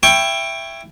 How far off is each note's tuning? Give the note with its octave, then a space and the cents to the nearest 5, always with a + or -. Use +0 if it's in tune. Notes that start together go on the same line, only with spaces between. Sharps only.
E4 +15 G5 +10 C#6 -5